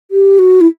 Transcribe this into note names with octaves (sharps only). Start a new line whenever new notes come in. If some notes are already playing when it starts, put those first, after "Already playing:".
G4
F#4
E4